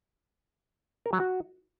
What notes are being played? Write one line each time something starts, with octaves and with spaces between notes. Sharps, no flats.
A#4
F#3
F#4